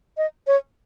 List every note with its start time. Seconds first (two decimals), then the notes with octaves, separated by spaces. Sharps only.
0.17 D#5
0.47 C#5